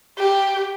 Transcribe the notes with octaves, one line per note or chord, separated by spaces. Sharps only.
G4